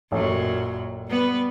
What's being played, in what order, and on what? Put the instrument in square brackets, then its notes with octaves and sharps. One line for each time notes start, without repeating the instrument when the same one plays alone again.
[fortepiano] A1 [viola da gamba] F#2 A#2 F#3
[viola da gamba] G3 B3 B4